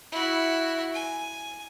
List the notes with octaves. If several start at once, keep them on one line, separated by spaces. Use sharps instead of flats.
E4 F#4
G#5